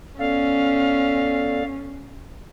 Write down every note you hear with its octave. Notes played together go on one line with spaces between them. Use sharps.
B3 C#4 A4 D5 F5